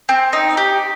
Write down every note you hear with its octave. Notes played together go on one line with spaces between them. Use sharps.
C4
D#4
G4